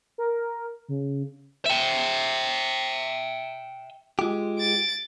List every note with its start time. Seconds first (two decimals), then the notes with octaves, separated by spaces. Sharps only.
0.18 A#4
0.88 C#3
1.66 E5 G5
4.19 G#3 F4 G4
4.59 A6 D7